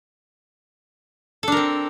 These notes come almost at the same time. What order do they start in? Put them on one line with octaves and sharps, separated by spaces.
A4 D4 A#4 C4